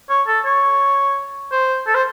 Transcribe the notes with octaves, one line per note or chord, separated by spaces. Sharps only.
C#5
A4
C#5
C5
A4
C5